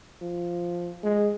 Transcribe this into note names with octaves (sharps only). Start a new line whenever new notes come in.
F3
G#3